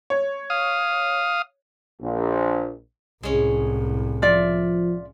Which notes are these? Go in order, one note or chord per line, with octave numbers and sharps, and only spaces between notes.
C#5
F5 D#6
A#1
C2 A2 G#3 C#4
F3 F4 D5 E5